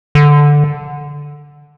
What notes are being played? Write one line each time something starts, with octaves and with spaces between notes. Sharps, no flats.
D3